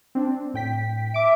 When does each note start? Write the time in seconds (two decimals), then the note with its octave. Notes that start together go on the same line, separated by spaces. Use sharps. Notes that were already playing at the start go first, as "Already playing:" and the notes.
0.15 C4 D4
0.54 A2 G5 B6
1.14 E5 D6 D7